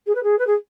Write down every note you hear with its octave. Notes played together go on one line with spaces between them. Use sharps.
G#4
B4
G#4
B4
G#4